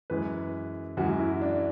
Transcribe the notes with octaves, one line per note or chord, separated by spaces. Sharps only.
F#2 E3 G#3 B4
F#2 E3 G#3 F#4
E4
D4